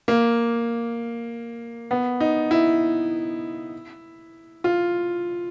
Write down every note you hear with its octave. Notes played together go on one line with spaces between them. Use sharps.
A#3
B3
D#4
E4
F4